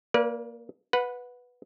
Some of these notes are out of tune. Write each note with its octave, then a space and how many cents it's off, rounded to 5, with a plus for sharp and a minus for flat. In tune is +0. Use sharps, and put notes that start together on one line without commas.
A#3 +0 B4 -45 D5 -20
B4 +0 F#5 -20